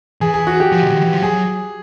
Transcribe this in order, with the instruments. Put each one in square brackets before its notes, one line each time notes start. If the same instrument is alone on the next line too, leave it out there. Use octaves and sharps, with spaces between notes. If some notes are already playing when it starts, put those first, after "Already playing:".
[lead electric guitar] E3 [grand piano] G#4
[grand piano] G#4
F#4
G4
[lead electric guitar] F3
D3
D#3
E3
F3
[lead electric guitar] F#3 [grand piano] G#4